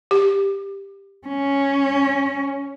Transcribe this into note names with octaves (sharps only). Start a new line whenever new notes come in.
G4
C#4